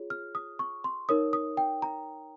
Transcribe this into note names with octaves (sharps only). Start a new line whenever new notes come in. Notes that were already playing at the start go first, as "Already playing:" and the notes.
Already playing: F4 G#4 C#5
F6
D#6
C#6
C6
D#4 A#4 C#5 D#6
D#6
G5
A#5